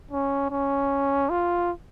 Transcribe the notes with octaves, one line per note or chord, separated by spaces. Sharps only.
C#4
C#4
F4